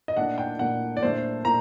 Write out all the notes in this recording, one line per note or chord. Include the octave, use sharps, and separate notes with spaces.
D#5
A#2 A3 D4 F#5
G5
A#2 A3 D4 F#5
D5
A#2 A3 D4 C5
A#2 A#5